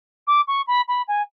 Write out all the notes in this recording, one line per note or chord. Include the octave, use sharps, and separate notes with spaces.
D6
C#6
B5
B5
G#5